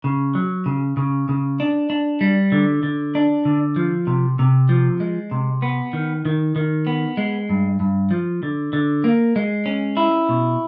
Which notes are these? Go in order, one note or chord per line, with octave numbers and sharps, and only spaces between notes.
C#3
F#3
C#3
C#3
C#3
D4
D4
G3
D3
D3
D4
D3
F3
C3
C3
F3
G#3
C3
B3
D#3
D#3
D#3
B3
G#3
G2
G2
F3
D3
D3
A#3
G#3
C#4
E4
B2